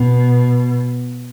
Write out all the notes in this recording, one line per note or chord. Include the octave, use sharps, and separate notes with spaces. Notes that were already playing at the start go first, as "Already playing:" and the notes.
Already playing: B2